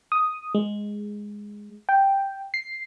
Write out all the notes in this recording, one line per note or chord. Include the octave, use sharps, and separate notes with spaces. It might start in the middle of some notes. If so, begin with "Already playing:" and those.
D#6
G#3
G5
C7